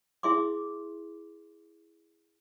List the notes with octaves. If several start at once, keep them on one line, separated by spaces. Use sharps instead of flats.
E4 G#4 E5 C6 D6